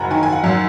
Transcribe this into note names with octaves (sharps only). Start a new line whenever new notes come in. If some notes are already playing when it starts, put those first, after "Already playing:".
Already playing: F#1 F#5 G#5 A#5
D#3 G#5
G#5
F#5
F#2